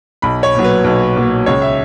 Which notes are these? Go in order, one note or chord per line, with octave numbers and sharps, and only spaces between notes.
B1 B5
C#5
A#2 F#3
B4
B1
A#2 F#3
C#2 C#5
E5